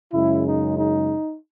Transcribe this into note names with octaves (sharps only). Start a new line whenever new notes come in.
F#2 C#3 G#3 E4
D#4
D#4